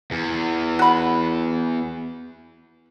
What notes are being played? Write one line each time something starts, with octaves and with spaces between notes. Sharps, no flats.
E2
F#4 B5